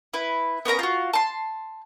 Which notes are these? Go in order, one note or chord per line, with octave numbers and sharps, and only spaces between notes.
E4 B4
B3 C#4 A#4 A#5
F4 F#4
A5 C6